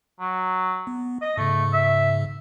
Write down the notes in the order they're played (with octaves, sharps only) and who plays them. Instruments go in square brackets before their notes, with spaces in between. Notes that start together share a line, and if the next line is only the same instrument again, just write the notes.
[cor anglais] F#3
[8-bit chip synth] B3
[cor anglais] D#5
[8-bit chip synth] G#2 C#3 [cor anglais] A3
[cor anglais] E5